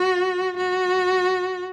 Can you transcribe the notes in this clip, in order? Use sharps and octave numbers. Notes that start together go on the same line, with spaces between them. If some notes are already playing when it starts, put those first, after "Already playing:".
Already playing: F#4
F#4